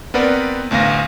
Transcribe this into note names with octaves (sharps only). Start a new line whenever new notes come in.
B3 C4 A#4 B4 D5 F#5
A1 D2 B3 F5 A#6